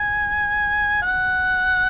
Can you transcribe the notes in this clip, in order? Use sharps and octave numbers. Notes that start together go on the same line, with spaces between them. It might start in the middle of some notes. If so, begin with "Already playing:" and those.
Already playing: G#5
F#5